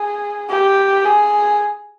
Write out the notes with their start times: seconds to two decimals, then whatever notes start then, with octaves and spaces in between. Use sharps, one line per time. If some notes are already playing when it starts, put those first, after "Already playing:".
Already playing: G#4
0.50 G4
1.05 G#4